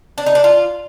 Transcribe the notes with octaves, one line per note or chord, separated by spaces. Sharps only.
D4
D#4
D4
F4